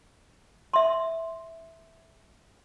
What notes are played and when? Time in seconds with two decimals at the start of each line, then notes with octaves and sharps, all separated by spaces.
0.74 E5 C6